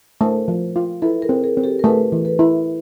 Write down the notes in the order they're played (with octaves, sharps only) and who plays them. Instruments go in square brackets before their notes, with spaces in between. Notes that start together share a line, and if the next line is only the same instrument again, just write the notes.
[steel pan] A3 [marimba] A#4 C5
[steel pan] F3
F4
[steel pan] E4 [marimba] A4 B4
[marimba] G#4 A#4
[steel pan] C4
[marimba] G#4 A#4
[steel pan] C4
[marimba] G4 A4
A#4
[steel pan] A3 [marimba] A4 B4
[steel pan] E3
[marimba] A4 B4
[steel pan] E4